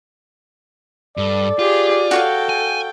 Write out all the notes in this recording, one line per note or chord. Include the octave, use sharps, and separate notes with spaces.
G2 A4 D5
F4 G4 G#4
F#4 A4 C#5 F5 G5
G#5